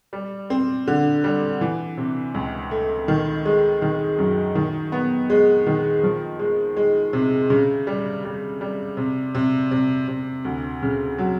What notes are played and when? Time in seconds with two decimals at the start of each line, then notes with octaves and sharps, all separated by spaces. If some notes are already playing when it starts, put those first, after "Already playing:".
0.13 G3
0.50 C4
0.87 D3
1.24 G3
1.61 E3
1.97 C3
2.34 C#2
2.71 A3
3.08 D#3
3.45 G#3
3.82 D#3
4.18 F#2
4.55 D#3
4.92 B3
5.30 G#3
5.67 D#3
6.03 F3
6.39 G#3
6.77 G#3
7.13 C3
7.50 C#3
7.87 G3
8.25 G3
8.61 G3
8.97 C3
9.35 C3
9.71 C3
10.08 C3
10.45 D2
10.82 C#3
11.18 F#3